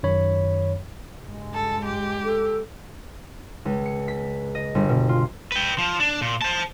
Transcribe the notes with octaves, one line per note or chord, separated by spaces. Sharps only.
F#2 D#3 C#5 B5
C#2 G2 G#3
A4
G4
A4
C#2
C#7
B6
D#5
G1
B2
F4
B4 G5
F3
D4
A#2
C5 A5